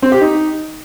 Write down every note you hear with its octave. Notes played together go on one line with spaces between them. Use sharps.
C4
G4
D#4